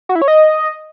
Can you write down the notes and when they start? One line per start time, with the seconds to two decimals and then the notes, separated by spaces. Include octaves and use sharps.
0.09 F#4
0.15 E4
0.22 C#5
0.28 D#5